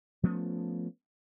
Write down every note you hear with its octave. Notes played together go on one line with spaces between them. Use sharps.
F3 A3 B3 C#4